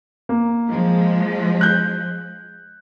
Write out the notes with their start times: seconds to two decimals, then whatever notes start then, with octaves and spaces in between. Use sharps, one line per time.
0.29 A#3
0.69 F3 G#3
1.61 F#6 G6